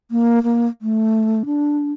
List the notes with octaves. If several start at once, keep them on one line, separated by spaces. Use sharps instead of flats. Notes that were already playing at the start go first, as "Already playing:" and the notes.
A#3
A#3
A3
D4